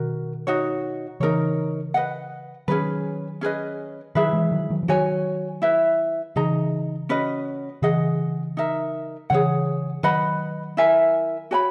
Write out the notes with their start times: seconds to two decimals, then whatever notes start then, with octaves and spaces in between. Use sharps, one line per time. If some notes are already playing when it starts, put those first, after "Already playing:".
Already playing: B2 D#3 F#4 A#4
0.47 D#4 F#4 C#5
1.20 C#3 E3 D#4 A#4 C#5
1.94 B4 D#5 F#5
2.68 D#3 F#3 C#4 G#4 B4
3.41 C#4 G#4 B4 D#5
4.15 D#3 F#3 E4 G#4 B4 E5
4.33 E3 G#3
4.52 D#3 F#3
4.70 D#3 F#3
4.83 E3
4.88 D#3 F#3 F#4 C#5 G#5
5.62 E4 B4 E5
6.36 C#3 E3 D#4 G#4 D#5 A#5
7.09 C#4 F#4 B4 D#5
7.82 C#3 E3 G#4 D#5 F#5
8.57 D#4 A#4 E5
9.30 C#3 E3 G#4 C#5 F#5
10.03 D#3 F#3 B4 D#5 F#5 B5
10.77 E4 A#4 E5 G#5
11.51 F#4 C#5 G#5 B5